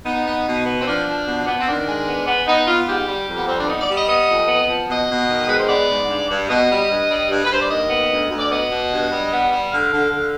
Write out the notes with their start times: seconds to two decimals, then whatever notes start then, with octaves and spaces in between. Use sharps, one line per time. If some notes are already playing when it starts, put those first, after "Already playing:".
0.06 B3 D#4
0.25 B3
0.46 B2
0.66 B3
0.80 C4
0.86 F3 D4
1.06 F3
1.26 B2
1.46 B3
1.60 C4
1.66 D#3 D4
1.87 G#3
2.07 B3
2.26 B3
2.47 B3 D#4
2.67 B3 F4
2.87 G#2 G4
3.07 G3
3.27 F2
3.36 B3
3.46 G3 C4
3.57 D4
3.67 B3 D#4
3.81 D5
3.87 G3
3.94 D#5
4.08 B3 D#5
4.28 F2
4.48 B3
4.68 F3
4.88 B2 D#5
5.09 B2
5.28 D#3
5.46 G#3 B4
5.57 C5
5.68 B3 D5
5.89 G#2
6.09 G2
6.29 G2
6.49 B2 D#5
6.69 G3
6.89 G2
7.09 G3
7.29 G2
7.44 B4
7.50 G2 C5
7.61 D5
7.69 D#2 D#5
7.90 B3
8.10 D2
8.30 D2
8.39 D5
8.50 B3 D#5
8.70 B2
8.90 G2
9.10 G3
9.31 B3
9.51 G3
9.71 D3 F5
9.91 D3
10.11 D3